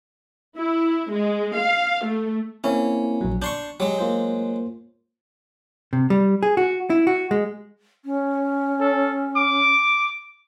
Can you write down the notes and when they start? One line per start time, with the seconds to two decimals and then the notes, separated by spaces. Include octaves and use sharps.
0.56 E4
1.12 G#3
1.56 F5
2.04 A3
2.64 A#3 C4 C#4 E4
3.21 A#1 F#3
3.42 D4 C6 C#6 G6
3.80 F#3 G#3 G4
3.99 A#3 F4 C5
5.93 C3
6.10 G3
6.43 G#4
6.57 F#4
6.90 E4
7.07 F#4
7.31 G#3
8.05 C#4
8.80 A4
9.36 D6